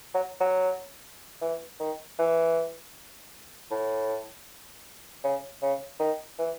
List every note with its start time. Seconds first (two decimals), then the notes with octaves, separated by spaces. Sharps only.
0.14 F#3
0.40 F#3
1.42 E3
1.80 D#3
2.19 E3
3.71 A2
5.24 C#3
5.62 C#3
6.00 D#3
6.39 E3